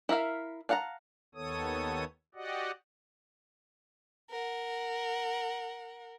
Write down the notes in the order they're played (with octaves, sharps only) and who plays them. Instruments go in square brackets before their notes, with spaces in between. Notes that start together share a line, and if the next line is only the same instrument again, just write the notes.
[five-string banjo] E4 A#4 E5 F5
D4 F5 F#5 A5 A#5
[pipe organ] D#2 D#3 B3 A4 C#5 D#6
F#4 G4 D5 D#5 F#5
[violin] A#4 F#5